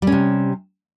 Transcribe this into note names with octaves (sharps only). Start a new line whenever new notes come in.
C3 G3 C#4